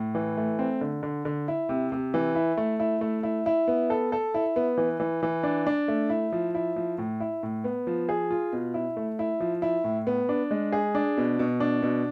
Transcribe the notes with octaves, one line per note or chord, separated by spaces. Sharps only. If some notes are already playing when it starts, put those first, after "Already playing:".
Already playing: A2
E3
A3
C4
D3
D3
D3
E4
C3
C3
E3
E4
A3
E4
A3
E4
E4
B3
A4
A4
E4
B3
E3
E3
E3
D4
D4
A3
E4
F3
E4
F3
A2
E4
A2
B3
F3
G#4
F4
B2
E4
A3
E4
F3
E4
A2
B3
D4
G#3
G#4
D4
B2
B2
D4
B2